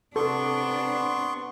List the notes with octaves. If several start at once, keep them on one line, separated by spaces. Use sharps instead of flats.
C3 B3 D4 A4 C6 C#6